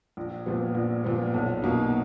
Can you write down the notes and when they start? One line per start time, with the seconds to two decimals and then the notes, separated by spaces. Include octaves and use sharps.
0.17 A#1
0.46 A#2 F3 B3
0.75 A#1
1.04 A#2 F3 B3
1.34 B1
1.62 B2 A#3 D#4 F#4